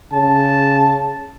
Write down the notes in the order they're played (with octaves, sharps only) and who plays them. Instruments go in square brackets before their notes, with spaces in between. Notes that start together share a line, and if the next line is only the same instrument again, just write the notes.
[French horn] C#3 [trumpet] A5